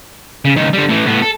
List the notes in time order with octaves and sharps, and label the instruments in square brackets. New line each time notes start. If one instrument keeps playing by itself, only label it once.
[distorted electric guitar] C#3
C#2 D#3
D3 G3
A2 E3
A2 B3
A4